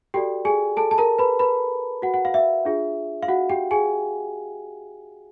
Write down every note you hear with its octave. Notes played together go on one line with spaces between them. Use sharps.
F#4 G4 A4 D5 G5
G#4 G#5
A4 A5
A5
A#4 A#5
B4 B5
B4 B5
F#4 F#5
F#5
F5
E5
D4 F4 G#4
F5
F#4 F#5
G4 G5
G#4 G#5